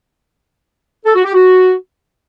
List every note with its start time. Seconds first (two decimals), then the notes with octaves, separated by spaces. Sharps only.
1.05 A4
1.15 F#4
1.24 G4
1.34 F#4